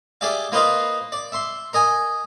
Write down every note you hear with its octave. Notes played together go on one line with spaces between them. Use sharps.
G4 G#4 D5 E5 F5
A#3 F4 B4 C5 D#5 F5
D5
E5 C6
A#4 D#5 G#5